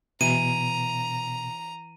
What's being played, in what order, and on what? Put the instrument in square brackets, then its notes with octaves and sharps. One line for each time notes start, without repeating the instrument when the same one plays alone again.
[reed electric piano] B2 [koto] E3 [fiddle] A#5 [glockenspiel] D#7